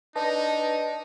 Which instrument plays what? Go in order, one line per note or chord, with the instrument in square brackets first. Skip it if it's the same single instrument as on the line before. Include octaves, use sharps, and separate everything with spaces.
[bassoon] D4 [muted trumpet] D#4 [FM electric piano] B4 A5 [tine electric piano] D#5